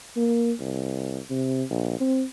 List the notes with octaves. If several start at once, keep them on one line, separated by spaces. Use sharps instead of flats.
A#3
C2
C3
A#1
C4